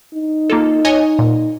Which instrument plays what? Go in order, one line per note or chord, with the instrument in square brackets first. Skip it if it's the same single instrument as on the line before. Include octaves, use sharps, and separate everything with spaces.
[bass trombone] D#4
[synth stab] A#3 F4 A4
C#5 D#5 G#5
A#2